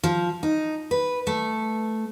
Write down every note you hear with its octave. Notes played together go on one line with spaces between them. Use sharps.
F3
D#4
B4
A3